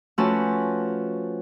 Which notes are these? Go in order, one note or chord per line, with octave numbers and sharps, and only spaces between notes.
F3 A3 C#4 F#4 B4 A5